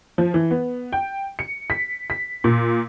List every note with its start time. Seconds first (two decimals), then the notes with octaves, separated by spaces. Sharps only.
0.18 F3
0.34 E3
0.51 B3
0.92 G5
1.39 C#7
1.70 B6
2.10 B6
2.44 A#2